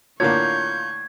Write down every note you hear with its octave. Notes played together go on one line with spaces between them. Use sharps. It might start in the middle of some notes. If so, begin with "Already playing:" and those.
A2 D3 A#3 F4 C#5 C#6 G6 G#6